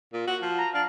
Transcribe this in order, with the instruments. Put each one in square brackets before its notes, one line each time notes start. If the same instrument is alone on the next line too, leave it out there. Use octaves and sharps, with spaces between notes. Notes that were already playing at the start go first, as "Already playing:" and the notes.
[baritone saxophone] A#2
F#4
F3
[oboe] A#5
[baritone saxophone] D4 [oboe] F5